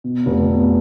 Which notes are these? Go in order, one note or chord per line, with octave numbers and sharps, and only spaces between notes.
B2
F1
B2